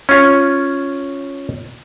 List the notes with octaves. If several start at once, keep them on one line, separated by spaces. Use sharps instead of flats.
C#4 F4 C#5